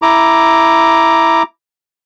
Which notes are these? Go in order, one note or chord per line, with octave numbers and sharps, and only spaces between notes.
E4 A#5 D6